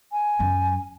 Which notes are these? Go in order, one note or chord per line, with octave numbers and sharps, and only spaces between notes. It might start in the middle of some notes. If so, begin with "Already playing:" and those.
G#5
F#2 F#3